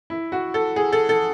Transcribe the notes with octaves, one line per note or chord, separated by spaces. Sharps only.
E4
F#4
A4
G#4
A4
A4